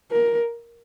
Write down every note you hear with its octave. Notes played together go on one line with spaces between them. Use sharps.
A#4